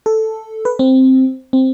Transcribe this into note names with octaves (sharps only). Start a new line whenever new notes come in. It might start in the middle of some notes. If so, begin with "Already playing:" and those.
A4
B4
C4
C4